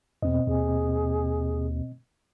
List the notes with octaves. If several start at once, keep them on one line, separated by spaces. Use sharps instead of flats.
E2 B2 C4 D#5
D#2 G#4